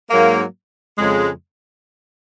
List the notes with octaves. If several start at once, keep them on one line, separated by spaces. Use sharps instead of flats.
G#2 F#3 A#3
F2 C#3 G#3